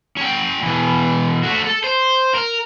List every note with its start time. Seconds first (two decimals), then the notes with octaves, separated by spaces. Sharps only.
0.17 C#4 G5
0.63 B2 E3
1.43 A3 F#4
1.67 A4
1.84 C5
2.35 A#4